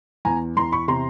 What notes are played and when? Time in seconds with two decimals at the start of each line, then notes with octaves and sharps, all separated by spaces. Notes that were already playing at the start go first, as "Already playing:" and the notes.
0.25 E2 G#5 A#5
0.57 E2 A#5 C6
0.72 B5 C#6
0.88 C3 A#5 C6